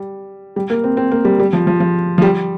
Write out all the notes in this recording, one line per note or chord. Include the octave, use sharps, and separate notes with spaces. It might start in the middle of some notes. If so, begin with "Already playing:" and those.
Already playing: G3
G3
A#3
C4
C4
A#3
G3
G3
F3
F3
F3
F3
G3